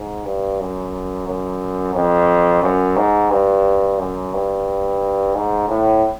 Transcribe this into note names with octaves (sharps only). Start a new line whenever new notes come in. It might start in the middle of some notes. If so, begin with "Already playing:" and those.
Already playing: G#2
G2
F#2
F#2
F2
F#2
G#2
G2
F#2
G2
G#2
A2